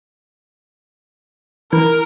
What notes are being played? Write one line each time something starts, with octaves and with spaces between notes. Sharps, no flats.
E3 A#4